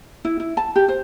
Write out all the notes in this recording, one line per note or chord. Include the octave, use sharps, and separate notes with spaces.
E4
E4
A5
G4
C5